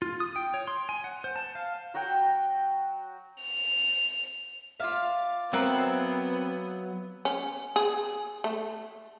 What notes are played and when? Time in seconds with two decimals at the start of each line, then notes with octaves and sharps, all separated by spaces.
0.02 F4
0.20 D#6
0.36 G5
0.54 C#5
0.67 C6
0.89 G#5
1.04 F#5
1.24 C5
1.36 A5
1.55 F5
1.94 F#3 F#4 F#5 G5
3.42 F7
4.80 F4 D5 E5 F5
5.53 F#3 B3 C4 A#4 B4 E5 F#5
7.25 C#4
7.76 G#4
8.44 A3